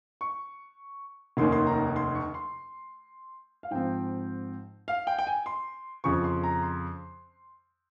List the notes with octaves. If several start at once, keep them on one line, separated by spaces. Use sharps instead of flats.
C#6
F1 D#2 D#3 A#3 C#4 C6
C6
A#5
C6
C#6
C6
F5
G#2 F3 C4 G5
F5
G5
G5
G#5
C6
F2 C#3 F3 C#6
C6
A#5
C6